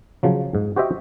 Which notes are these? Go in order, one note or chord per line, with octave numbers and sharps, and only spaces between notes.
C#3 F3 F#3
G#2
F#4 G4 C5 D#5 E5 G5